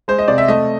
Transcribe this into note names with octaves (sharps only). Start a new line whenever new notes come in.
G#3 C5
D#5
C3 D5
E5
A3 D#5